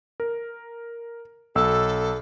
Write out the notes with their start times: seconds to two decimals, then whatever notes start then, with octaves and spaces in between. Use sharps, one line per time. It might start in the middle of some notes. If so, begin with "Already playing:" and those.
0.20 A#4
1.55 B1 A4 E6